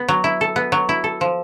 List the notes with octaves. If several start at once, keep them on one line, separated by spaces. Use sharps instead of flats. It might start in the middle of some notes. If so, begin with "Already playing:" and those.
Already playing: B3
F#3
E4
A4
B3
F#3
E4
A4
F3